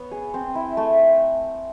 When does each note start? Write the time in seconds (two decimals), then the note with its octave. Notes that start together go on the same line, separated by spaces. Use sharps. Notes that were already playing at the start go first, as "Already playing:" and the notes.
Already playing: B3 C#5
0.11 G#4
0.34 C4
0.55 E4
0.77 A3